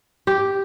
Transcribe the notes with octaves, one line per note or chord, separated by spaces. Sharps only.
G4